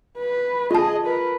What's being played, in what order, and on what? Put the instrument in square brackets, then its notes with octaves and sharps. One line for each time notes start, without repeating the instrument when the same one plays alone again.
[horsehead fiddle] B4
[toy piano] F4 A5 [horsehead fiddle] G#4 D#5
[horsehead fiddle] A#4 B4